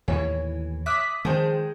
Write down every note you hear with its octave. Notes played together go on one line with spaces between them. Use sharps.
D#2 A2 E3 C#5 G#5
E5 D6 D#6 F#6 B6
D#3 F3 G#3 D4 G#4 C5 G5